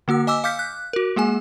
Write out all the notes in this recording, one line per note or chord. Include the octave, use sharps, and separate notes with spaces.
D3 A#3 F#4 E6
D#5 G#5 D6 E6
F5 D6 F6 G6 B6
F#6
F#4 A#4
G#3 A#3 G#4 G#5